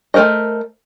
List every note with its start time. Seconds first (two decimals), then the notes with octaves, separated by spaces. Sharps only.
0.14 A3 D#4 A#4 C5 D#5